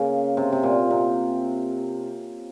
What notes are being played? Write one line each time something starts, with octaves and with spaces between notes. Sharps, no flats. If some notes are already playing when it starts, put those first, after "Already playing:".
Already playing: C#3 A#3
C3
C3
A#2
C3